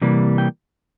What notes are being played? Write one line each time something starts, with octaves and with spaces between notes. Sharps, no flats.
C3 E3 G3 A#3
G5